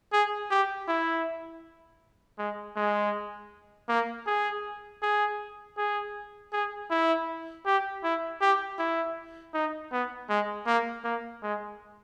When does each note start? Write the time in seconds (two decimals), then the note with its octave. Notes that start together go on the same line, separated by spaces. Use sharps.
0.13 G#4
0.50 G4
0.88 E4
2.39 G#3
2.76 G#3
3.89 A#3
4.27 G#4
5.02 G#4
5.77 G#4
6.53 G#4
6.90 E4
7.66 G4
8.04 E4
8.41 G4
8.79 E4
9.54 D#4
9.92 B3
10.29 G#3
10.67 A#3
11.04 A#3
11.43 G#3